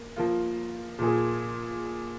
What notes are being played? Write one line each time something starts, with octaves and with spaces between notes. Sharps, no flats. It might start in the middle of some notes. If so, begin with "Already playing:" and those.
Already playing: A#3
F3 A#3 F4
A#2 F3 A#3 G#4